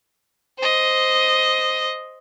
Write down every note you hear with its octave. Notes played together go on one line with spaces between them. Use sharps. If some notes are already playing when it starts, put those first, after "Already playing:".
C5 D#5